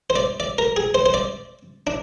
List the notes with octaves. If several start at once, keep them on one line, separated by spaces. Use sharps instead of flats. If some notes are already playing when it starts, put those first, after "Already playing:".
C5
D5
D5
A#4
G#4
C5
C5
D5
D4